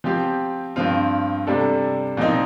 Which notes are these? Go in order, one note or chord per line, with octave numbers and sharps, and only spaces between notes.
F3 C4 G4
G2 F3 C4 F4
C3 G3 D4 A4
A#2 F3 C4 D#4